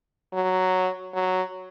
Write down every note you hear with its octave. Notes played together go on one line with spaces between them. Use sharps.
F#3
F#3